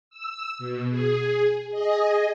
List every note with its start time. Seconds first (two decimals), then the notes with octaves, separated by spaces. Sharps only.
0.10 E6
0.59 B2
0.90 G#4
1.71 G#4 D#5